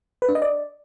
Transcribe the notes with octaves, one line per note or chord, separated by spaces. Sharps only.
B4
D4
D#5
D5